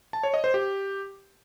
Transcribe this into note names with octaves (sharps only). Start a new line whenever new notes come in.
A5
C#5
D#5
C5
G4